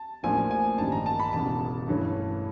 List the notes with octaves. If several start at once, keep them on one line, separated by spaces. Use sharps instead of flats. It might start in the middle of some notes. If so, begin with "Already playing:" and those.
Already playing: A5
A1 A2 F3 A#3 D4 G#5
G#5
A1 G2 D#3 G3 A5
A#5
A5
B5
E1 E2 C#3 A5
G2 E3 A3 C#4